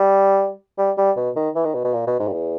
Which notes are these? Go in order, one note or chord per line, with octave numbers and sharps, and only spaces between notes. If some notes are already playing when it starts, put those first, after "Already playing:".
Already playing: G3
G3
G3
B2
D#3
E3
D#3
B2
B2
A#2
B2
G#2
G2
E2